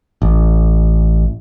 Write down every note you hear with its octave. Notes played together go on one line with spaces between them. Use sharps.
A1